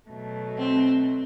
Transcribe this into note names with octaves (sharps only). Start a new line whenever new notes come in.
B2 F#3 A3
C4